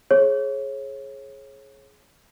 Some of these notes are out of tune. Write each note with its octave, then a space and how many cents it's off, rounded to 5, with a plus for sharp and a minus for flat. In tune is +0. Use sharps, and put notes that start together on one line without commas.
G#4 +20 C#5 -30